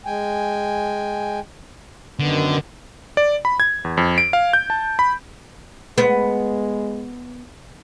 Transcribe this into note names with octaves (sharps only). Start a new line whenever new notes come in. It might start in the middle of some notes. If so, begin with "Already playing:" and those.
G#3 G5 G#5
F#2 D3 D#3 B3
D5
B5
G#6
E2
F2
D7
F5
G6
A5
B5
G#3 B3